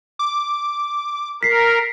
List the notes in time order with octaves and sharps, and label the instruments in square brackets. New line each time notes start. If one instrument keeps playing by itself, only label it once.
[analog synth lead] D6
[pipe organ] A#4 [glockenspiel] B6 C7